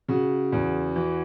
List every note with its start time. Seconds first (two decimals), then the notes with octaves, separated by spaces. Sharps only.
0.08 C#3 F#4
0.52 E2
0.96 E3 F#4